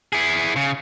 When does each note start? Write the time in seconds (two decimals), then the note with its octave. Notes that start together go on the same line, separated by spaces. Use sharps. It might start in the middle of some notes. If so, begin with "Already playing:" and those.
0.13 E4 G#4
0.56 C#3